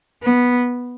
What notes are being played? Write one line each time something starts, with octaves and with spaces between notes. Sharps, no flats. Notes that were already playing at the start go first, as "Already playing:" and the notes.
B3